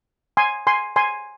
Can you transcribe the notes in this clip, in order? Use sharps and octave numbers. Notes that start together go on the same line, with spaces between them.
G#5 C6
G#5 C6
G#5 C6